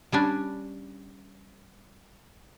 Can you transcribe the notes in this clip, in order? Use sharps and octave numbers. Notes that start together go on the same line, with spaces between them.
G3 C#4 D4